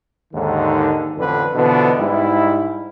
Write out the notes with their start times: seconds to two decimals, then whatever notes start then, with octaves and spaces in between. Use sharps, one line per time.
0.33 D#2 G#2 D3 D#3
1.17 A1 F2 D3 D4 B4
1.55 B2 D3 E3 F3 B3
1.99 G#2 G3 E4